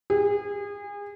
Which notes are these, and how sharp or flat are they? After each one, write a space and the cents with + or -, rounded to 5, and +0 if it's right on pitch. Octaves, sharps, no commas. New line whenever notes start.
G#4 -30